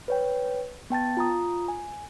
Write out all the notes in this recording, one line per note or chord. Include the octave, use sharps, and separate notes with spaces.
B4 C#5 G5
B3 G5 A5 A6
F4 A#5 D#6
G#5